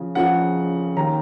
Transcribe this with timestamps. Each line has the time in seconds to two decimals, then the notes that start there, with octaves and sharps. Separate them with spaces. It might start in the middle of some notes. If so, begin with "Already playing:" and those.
Already playing: C#3 F3
0.15 C#2 C#3 F3 F#5
0.96 D#2 D#3 A#5